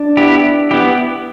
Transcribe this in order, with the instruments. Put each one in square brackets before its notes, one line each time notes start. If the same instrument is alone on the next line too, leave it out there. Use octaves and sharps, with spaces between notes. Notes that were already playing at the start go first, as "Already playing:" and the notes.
Already playing: [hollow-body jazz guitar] D4
[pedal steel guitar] B3 E4 G4
B3 E4 G4